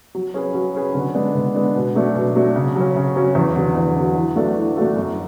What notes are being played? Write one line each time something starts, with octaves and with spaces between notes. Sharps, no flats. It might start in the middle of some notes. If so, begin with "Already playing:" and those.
F#3
C#4 G#4 B4
F#3
C#4 G#4 B4
D3
G#3 B3 D4
D3
G#3 B3 D4
B2
F#3 A3 D4
B2
F#3 A3 D4
C#3
F#3 C#4
C#3
F#3 C#4
E2
D3 F#3
E2
D3 F#3
E3
A3 D4 F#4 A4
E3
A3 D4 F#4 A4
F#2